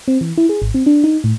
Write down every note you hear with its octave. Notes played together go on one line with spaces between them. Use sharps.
C4
E3
E4
G#4
G#1
C4
D4
D#4
A2